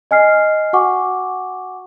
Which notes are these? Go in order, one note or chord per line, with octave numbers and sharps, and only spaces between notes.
D#5 G#5 F6 C7
F#4 F#5 G#5 C#6 D6